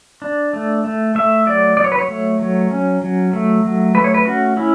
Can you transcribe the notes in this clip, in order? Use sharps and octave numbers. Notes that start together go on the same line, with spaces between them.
D4
A3
A3
A3 E5
F#3 D5
F#3 D5
C#5
B4
C#5
A3
F#3
C#4
F#3
A3
F#3
A3 B4
C#5
B4
C#4 F#4
C#4 E4